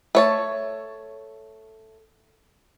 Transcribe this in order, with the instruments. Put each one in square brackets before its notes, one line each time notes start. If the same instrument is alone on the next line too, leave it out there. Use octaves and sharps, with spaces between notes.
[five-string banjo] A3 C#5 A5